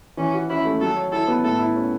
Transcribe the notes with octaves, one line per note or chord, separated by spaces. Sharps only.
E3 C#4
F#4
C#4 E4
A3
F#3 A4
C#5
E4 A4
B3
A2 A4
E4
C#4